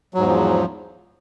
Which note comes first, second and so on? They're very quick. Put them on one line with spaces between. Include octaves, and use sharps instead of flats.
F#3 G#2 E2 F3